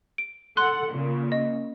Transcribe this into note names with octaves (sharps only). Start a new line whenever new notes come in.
D7
A4 F#5 C6 F#6
A#2 C#3
D#5